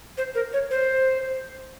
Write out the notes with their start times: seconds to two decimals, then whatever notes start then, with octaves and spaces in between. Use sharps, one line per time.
0.18 C5
0.35 A#4
0.53 C#5
0.71 C5